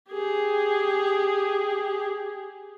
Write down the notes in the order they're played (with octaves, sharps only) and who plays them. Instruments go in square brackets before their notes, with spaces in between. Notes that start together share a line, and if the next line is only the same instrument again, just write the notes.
[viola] G4 G#4